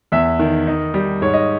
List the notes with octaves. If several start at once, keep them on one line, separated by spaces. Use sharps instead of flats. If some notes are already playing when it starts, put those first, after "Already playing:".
E2 E5
D#3
D#4
G3
G#2 C#5
D#5